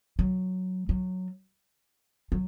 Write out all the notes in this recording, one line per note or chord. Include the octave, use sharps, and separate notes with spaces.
F#3
F#3
F#3